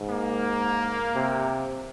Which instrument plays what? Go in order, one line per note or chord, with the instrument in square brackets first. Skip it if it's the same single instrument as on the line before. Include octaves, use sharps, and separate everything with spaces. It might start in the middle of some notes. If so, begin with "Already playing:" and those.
Already playing: [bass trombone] G#2
[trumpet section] A#3
[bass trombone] C3